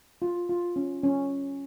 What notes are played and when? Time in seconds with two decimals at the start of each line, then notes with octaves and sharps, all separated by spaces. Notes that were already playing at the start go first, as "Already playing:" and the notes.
0.22 F4
0.49 F4
0.76 C#4
1.03 C#4